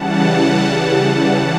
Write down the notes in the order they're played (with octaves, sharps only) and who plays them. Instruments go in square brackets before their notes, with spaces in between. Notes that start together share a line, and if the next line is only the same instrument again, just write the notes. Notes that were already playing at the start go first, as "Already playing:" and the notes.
Already playing: [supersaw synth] C#3 E3 G3 F#5 A5